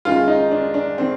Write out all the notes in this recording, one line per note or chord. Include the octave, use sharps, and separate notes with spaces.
F#2 D#3 G#3 F4
D#4
D4
D4
D#3 C4